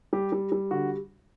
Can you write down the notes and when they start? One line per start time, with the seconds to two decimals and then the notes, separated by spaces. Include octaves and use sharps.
0.13 G3 G4
0.32 G3
0.52 G3
0.71 D3 F#4